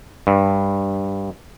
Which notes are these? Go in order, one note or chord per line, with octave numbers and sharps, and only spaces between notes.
G2